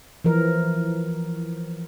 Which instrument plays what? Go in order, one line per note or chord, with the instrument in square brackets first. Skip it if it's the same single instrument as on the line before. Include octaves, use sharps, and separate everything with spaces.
[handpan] E3 F3 A#4